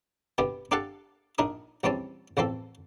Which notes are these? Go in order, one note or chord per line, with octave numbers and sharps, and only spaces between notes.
B2 D3 B3 G4
D4 G4 A4 F5 F#5 A5
A#1 D4 D#4 A#4 D#6
A#1 E2 G3 C4 C#4 A5
A1 E2 F3 C4 A4